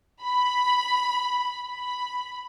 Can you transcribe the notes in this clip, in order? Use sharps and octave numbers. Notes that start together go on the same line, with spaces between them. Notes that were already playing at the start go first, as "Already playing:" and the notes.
B5
B5